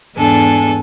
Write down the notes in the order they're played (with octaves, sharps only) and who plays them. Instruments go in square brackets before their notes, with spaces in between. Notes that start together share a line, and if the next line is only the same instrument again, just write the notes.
[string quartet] E2 G#2 D4 A4 G#5